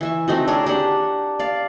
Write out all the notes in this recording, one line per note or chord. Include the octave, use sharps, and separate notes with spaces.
E3 E5 C#6
A3 C4 D#4 F#4
D4 G#4 A#4 C#5
D4 G4 F#5
D5 F5